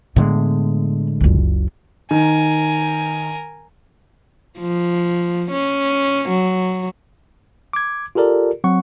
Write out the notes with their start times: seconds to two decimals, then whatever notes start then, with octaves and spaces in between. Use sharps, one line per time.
0.16 A2 D3 G#3 B3
1.20 F#1 C#2
2.11 D#3 A#4 G#5
4.59 F3
5.51 C#4
6.29 F#3
7.73 D6 G#6
8.15 F4 G4 A4 A#4 D5
8.64 F#3 C4 F#5 C#6